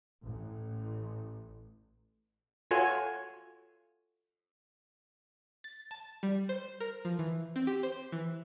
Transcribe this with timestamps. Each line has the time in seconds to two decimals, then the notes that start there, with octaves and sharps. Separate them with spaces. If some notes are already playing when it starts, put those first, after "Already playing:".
0.21 A1
2.71 F4 F#4 A4 C#5 G#5
5.64 A6
5.91 A5
6.23 G3
6.49 C5
6.80 A#4
7.05 F3
7.19 E3
7.56 C4
7.67 G4
7.83 C5
8.12 E3